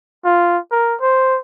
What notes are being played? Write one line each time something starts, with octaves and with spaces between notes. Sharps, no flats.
F4
A#4
C5